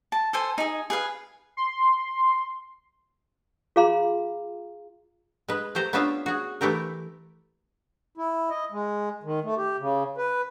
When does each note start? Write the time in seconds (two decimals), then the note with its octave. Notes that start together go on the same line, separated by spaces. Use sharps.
0.12 A5
0.33 A4 C5 G#5
0.58 D#4 G#4
0.90 G#4 B4 F5
1.57 C6
3.76 F4 G#4 F5 A#5 C6
5.48 G#3 B4
5.75 A3 G4 C5 A#5
5.93 B3 C#4 D4 F4 E5 F5
6.26 F#4 G#4
6.61 E3 A3 E4 G4 A#4
8.18 E4
8.50 D#5
8.72 G#3
9.23 D#3
9.44 A3
9.57 G4
9.79 C#3
10.18 B4